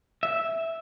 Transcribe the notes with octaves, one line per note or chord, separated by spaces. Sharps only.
E5